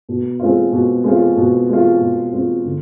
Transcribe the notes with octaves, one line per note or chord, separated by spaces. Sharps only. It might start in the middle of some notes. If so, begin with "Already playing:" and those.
B2
G#3 C4 F4
B2
G#3 C4 F4
B2
G#3 C4 F4
B2
G#3 C4 F4
D3